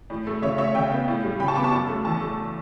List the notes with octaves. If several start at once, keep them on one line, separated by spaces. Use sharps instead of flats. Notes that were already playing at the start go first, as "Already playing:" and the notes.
A2
A3
C#3 C#5 E5
A3 C#5 E5
C#3 E5 G5
B3
A2
G3
C#3 G5 B5
A5 C#6
B3 B5 D6
A5 C#6
F#2
A3
E2 A5 C#6
A3